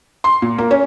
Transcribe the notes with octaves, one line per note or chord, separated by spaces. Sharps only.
C6
A#2
A#3
C#4